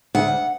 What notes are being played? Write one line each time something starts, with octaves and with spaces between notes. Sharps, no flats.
D2 F#5